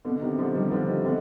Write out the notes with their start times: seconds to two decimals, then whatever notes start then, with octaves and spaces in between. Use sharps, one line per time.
0.05 B2 D3
0.21 C3 D#3
0.38 D3 F3
0.55 D#3 G3
0.68 D#3
0.72 D3 F3
0.88 C3 D#3
1.01 C3
1.05 B2 D3